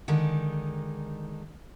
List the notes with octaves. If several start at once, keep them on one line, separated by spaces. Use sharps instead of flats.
D3 D#3 G#3 D#4